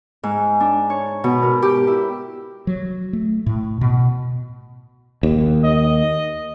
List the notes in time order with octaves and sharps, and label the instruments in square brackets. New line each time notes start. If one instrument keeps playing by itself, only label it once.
[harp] G#2
D4
C#5
B2
A#4
G4
E4
[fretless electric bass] F#3
A3
A2
B2
D#2
[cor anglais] D#5